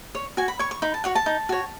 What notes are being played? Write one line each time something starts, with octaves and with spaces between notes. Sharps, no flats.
C#5
F#4 G#5
B5
C#5 C#6
C#6
D#4 B5
A5
F#4 C#5 F#5
A5
D#4
F#4 C#5